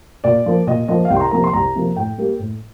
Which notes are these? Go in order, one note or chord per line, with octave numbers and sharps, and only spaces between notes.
A#2 D5
F3 A#3
A#2 D#5
F3 A#3 D#5
F5
C2 G5
C6
A#5
C3 F3 A#3 A#5
C6
C2 A#5
C3 F3 A#3
A2 G5
G3 A#3
A2